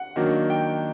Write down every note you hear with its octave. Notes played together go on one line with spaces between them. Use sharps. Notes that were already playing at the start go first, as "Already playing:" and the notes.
Already playing: F#5
D#3 F#3 A#3 D4
G5